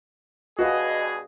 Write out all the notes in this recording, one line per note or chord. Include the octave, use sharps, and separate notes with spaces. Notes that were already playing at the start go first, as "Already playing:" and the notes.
G2 B2 F#4 G#4 B4 D#5 F5